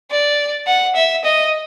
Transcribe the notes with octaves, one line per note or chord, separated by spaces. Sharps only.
D5
F#5
E5
D#5